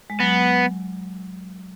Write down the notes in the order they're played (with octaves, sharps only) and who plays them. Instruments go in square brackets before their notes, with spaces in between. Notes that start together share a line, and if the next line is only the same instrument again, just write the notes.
[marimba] G#3
[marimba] F#3 [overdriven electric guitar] B3